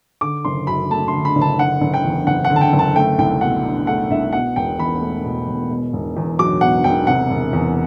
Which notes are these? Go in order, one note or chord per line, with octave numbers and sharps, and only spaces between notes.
D3 D6
F#1 C6
F#2 B5
A3 A5
C6
D3
B5
F#1
A5
D3 F#5
F#1
G5
E2
F#1 F#5
F#5
D3
A5
G5
F#1
A5
A3 G5
C2 G5
B2 F#5
D4
A3 F#5
C2 E5
B2 F#5
E1 G5
E2 B5
A3
B2
E1
B2
E1
E2
F#3 D6
B2 F#5
E1 G5
C3 F#5
E1
E2